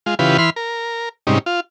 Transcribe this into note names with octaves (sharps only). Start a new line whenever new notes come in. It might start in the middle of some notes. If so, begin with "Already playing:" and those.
G#3 F4
C#3 E3 F4 G4 B4
E3 B5 C6 F6
A#4
G#2 C3 G3 C#4 D#4
F4